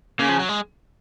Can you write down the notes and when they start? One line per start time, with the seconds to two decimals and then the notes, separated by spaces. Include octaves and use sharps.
0.19 C#3 A#3
0.29 F3
0.39 F#3
0.49 G#3